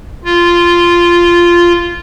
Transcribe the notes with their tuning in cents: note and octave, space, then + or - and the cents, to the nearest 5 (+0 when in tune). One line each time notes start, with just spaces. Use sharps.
F4 -10